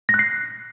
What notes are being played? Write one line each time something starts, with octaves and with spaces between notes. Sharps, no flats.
A#6
F#6
C7